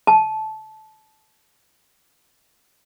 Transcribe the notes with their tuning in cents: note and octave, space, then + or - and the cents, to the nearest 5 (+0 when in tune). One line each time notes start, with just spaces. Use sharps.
A5 -20